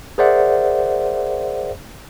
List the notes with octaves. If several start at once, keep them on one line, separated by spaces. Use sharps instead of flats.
G#4 A#4 C5 D5 E5 F#5